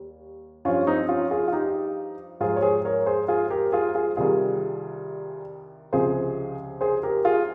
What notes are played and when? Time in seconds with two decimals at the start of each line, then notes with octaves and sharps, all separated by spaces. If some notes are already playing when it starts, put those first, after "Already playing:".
Already playing: D#2 G3
0.65 G2 F3 C#4 F4
0.87 C4 D#4
1.09 C#4 F4
1.31 F4 G#4
1.48 F4
1.52 D#4 G4
2.40 G#2 F3 F4 G#4
2.56 C#5
2.62 G#4 C5
2.85 A#4 C#5
3.06 G#4 C5
3.28 F4 G#4
3.50 G4 A#4
3.72 F4 G#4
3.95 F4 G#4
4.17 C2 C3 D#3 G3 F4 G#4
5.93 C#2 C3 F3 G#4 C5
6.81 G#4 C5
7.03 G4 A#4
7.25 F4 G#4